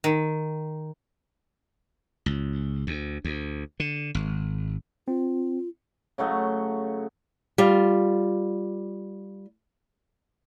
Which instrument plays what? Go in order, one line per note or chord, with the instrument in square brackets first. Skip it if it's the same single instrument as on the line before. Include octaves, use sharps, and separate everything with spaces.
[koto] D#3
[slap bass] C#2
D2
D2
D3
G#1
[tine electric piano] C4 [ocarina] F4
[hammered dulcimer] C#3 F#3 A3 D#5
[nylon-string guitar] G3 F4